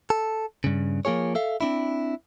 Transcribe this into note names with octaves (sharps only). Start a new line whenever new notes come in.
A4
G2 C#3
F3 A#3 F4 G#4 C#5
A4 E5 F5
C4 D4 E4